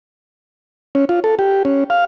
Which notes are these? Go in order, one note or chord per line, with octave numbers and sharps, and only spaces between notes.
C#4
F4
A4
G4
C#4
F5